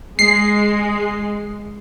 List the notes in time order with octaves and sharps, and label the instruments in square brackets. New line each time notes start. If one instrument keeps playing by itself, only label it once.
[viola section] G#3 [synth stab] C7